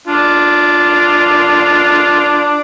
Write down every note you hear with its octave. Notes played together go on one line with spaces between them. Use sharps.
D4 F4